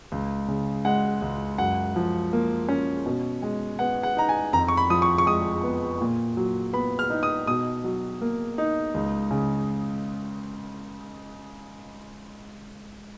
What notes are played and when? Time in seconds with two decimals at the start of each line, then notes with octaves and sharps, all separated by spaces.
0.12 C#2
0.48 C#3
0.85 G#3 F#5
1.22 C#2
1.58 F#2 F#5
1.96 F3
2.33 A#3
2.69 C#4
3.06 B2
3.42 G#3
3.79 B3 F#5
4.03 F#5
4.17 D#4 A#5
4.29 G#5
4.53 F2 A#5
4.68 C#6
4.77 B5
4.90 F3 D#6
5.02 C#6
5.18 C#6
5.26 G#3 D#6
5.64 B3
6.01 A#2
6.37 F#3
6.73 B3 B5
6.99 F6
7.10 D#4
7.23 D#6
7.47 B2 D#6
7.84 F#3
8.22 A#3
8.58 D#4
8.94 C#2
9.31 C#3